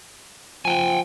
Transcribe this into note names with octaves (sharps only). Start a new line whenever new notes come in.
F3 G5 G#5